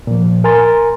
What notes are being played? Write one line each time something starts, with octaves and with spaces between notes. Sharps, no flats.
A#2 F3
A#4 G#5 A#5 C6 A6